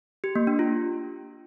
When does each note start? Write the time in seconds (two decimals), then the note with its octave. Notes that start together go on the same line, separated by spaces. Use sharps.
0.24 G4
0.35 A#3
0.47 D4
0.59 F4